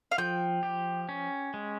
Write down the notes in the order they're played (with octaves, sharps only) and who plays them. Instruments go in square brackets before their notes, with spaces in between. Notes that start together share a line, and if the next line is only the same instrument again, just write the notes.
[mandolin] F5
[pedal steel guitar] F3 [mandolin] G5
[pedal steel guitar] G4
C#4
G#3